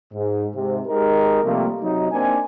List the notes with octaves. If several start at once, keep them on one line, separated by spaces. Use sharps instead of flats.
G#2
G#2 C3
G#3 D#4 G4 A#4
C3 F3 G3 A3 A#3
C3 F#3 D#4
A#3 C4 D4 D#4 G#5